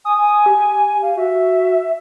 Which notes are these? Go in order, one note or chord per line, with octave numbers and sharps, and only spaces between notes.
G#5 D#6
G#5
G4
F5
F#4 E5